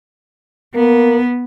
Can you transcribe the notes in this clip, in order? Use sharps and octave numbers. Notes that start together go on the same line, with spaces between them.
A#3 B3